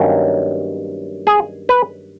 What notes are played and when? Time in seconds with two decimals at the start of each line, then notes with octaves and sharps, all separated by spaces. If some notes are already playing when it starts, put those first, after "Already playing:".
Already playing: G2 D#3 F#3 A#3 C#4
1.27 G#4
1.69 B4